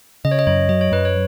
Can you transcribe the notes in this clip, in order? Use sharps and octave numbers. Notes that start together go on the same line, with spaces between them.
C#3 D#5
C#5
D#5
F#2 C#5
F#3 D#5
C#5
F#2 B4
C#5